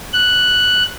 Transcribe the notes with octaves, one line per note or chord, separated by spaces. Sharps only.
F#6